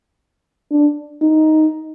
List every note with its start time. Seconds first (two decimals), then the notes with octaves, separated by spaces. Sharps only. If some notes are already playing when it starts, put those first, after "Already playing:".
0.71 D4
1.22 D#4